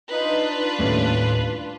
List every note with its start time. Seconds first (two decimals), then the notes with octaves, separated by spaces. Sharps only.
0.11 D4 D#4 F4 B4
0.79 D#2 A2 G3 A3 C#4